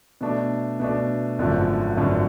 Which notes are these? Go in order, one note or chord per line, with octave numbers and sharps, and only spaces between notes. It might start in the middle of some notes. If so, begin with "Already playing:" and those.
B2 A3 D4
B2 A3 D4
G#1 F#2 D3 F3 A3
G#1 F#2 D3 F3 A3